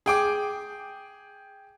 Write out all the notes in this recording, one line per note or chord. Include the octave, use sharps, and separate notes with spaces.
G#4 G5 D6